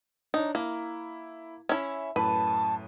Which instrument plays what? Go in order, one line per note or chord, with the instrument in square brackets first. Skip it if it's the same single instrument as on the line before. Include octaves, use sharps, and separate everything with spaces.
[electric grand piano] D4 C#5 [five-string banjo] D#4
[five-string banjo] A#3 [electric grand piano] E4
[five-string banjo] C#4 E4 [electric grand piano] E5
[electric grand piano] F#2 A2 D#7 [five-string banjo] B4 [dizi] A5